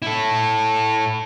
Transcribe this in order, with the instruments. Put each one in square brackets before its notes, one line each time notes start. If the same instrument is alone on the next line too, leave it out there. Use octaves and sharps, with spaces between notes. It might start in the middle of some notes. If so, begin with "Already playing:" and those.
[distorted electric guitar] E4 A4